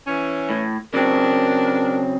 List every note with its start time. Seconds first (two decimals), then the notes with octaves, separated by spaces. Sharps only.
0.07 E3 C#4
0.50 A2
0.94 C#3 F#3 C4 D4 A#4